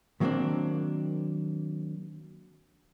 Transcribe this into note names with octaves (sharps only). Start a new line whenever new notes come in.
D#3 F#3 G3 A#3 C4 D4